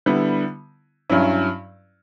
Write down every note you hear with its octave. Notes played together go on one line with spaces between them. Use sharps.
D3 G3 B3 E4
G2 F#3 C#4 E4